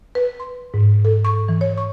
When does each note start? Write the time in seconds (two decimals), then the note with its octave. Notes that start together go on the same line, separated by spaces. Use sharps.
0.15 B4
0.40 C6
0.74 G#2
1.05 A4
1.25 C#6
1.48 E3
1.61 C#5
1.78 C#6